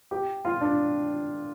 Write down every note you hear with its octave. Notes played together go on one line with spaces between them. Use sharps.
G4
F4
D4